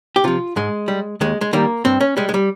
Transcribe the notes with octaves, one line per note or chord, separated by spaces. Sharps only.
G4
C3 F3 F4
G#2 G#3
G3
D#2 G#3
G#3
D#3 G3 A#3
G2 C4
C#4
G3 G#3
G#3
G3